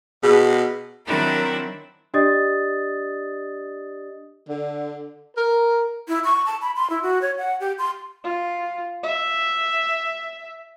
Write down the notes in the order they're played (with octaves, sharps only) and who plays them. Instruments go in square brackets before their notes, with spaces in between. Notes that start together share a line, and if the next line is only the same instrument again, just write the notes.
[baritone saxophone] B2 [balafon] G#4
[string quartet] D#3 F#3 C4 D4 E4 A#4
[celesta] D4 G4 D5 D#5 D#6 A6
[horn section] D3
A#4
[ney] E4
C#6
A5
B5
C6
E4
F#4
C#5
F#5
G4
C6
[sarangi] F4
E5